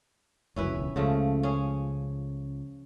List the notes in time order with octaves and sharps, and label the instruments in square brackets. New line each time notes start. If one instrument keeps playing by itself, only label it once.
[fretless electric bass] F1 C#2 F#2 [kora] C#4 E4 B4
[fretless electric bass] E1 C#2
[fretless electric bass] C#2 [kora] C#3 F3 A3
[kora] C#4 G#4